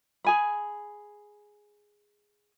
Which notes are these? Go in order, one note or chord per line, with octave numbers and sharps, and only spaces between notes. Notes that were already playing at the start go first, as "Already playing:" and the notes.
G#4 G#5 B5